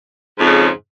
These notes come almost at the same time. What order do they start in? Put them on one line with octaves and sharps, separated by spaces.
G#2 F2 C#3